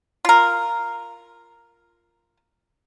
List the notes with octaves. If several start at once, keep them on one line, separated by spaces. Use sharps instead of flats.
F4 A#4